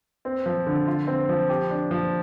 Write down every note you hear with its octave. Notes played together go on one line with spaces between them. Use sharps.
C4
F3
D3
F4
C4
F3
G4
D4
F3